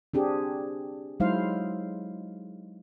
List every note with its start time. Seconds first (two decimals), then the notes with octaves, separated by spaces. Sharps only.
0.14 C4 D4 G4 G#4
1.20 F#3 G#3 D#4 E4 C5 F5